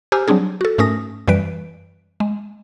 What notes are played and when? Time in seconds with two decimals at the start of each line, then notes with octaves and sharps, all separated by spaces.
0.12 G4 C5 G#5 A#5 E6 F6
0.28 F#3 G3 C4 D4 G#4
0.61 F#4 A4
0.78 G#2 A3 C#4 A#4 D#6 A#6
1.28 F#2 E3 G3 B4 D7
2.20 G#3